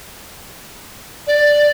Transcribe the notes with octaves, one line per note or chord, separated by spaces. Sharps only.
D5